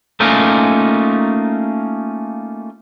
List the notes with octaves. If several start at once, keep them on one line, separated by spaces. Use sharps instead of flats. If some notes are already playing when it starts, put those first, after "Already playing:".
A3 A#3 C#4 D#4 F4 A#4